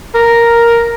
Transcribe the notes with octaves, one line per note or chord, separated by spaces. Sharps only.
A#4